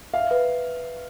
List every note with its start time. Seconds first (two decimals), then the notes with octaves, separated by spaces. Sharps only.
0.13 E5 F5
0.31 B4